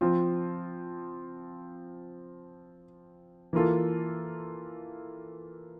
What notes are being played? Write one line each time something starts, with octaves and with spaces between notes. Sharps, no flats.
F3 C4 F4
E3 A#3 F4 A4